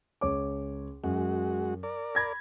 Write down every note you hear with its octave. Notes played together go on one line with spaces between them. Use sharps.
C#2 C#5 D6
F#2 G#3 F#4
A#4 D5
B5 G#6 A#6